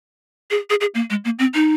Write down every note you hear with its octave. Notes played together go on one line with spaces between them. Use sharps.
G#4
G#4
G#4
A#3
G#3
A#3
C4
D#4